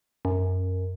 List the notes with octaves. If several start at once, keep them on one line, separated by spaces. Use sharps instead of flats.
F#2